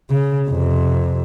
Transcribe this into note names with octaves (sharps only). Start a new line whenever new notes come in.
C#3
F2 C3